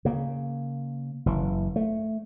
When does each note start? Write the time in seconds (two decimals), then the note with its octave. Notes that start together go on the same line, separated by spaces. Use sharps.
0.05 C#3 A#3
1.26 F#1 E3
1.76 A3